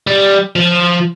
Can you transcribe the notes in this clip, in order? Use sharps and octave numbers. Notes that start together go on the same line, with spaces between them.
G3
F3